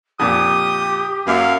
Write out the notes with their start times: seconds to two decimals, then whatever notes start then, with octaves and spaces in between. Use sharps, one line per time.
0.20 F2 A#2 G4 D#6
1.27 F#2 A#3 E5 F5